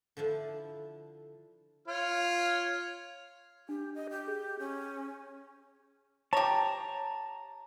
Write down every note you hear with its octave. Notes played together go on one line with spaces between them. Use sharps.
D3 F3 D4 E4
F4 C#5 F6
D4 G4
D#5
G4
G#4
C#4
G4 C#5 A5 A#5